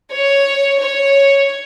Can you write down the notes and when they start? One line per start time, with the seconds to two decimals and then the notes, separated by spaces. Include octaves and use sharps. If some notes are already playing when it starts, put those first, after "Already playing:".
0.12 C#5
0.80 C#5